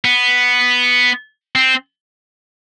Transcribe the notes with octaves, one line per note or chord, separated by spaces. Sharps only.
B3
C4